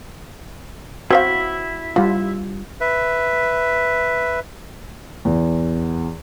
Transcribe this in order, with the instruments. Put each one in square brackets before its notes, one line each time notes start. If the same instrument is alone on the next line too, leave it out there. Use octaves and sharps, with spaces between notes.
[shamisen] C4 C5 F5 [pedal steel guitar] E4 E5 [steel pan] F#4
[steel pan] G3 F4 [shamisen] F#4
[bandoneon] B4 E5
[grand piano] E2